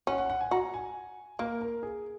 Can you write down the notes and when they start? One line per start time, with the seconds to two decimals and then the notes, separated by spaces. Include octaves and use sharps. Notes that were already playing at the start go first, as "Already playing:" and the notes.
0.07 C#4 F#5
0.18 F#5
0.30 F#5
0.41 G#5
0.51 F#4 A#5
0.74 G#5
1.39 A#3 A#4
1.61 A#4
1.83 G#4